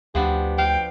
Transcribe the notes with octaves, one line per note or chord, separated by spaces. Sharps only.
D2 F3 B3 D4 G4
F5 G5